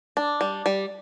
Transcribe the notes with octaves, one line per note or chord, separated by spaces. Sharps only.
D4
G3
G3